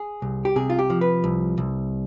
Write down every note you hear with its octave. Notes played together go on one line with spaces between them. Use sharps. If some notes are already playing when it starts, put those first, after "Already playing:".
Already playing: G#4
C2
G4
C3 G#4
F4
G4
F3
B4
C2
C2